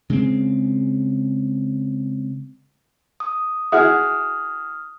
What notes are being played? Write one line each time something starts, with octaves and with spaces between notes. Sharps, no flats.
C#3 G#3 C4
D#6
E4 F#4 G#4 D#6 F6